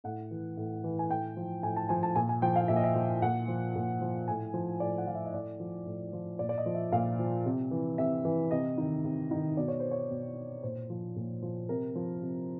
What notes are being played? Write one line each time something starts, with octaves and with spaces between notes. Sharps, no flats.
A2 F#5
E3
A2
E3
G#5
A2 G5
F3
A2 G#5
A5
F3 G#5
A5
A#2 G#5
G#5
F3 G5
F5
A#2 E5
D#5
E5
F3
A#2 F#5
F3
A#2
F3
A2 G#5
F3
A2 D5
F#5
F3 F5
E5
D#5
A2 D5
F3
A2
F3
A#2 D5
D5
D#5
F3
E5
A#2 F5
F3
C3
E3
C3 E5
E3
C3 D#5
D#3
C3
D#3
B2 D5
C#5
C5
C#5
B2
A#2 C5
F3
A#2
F3
C3 A#4
F3
C3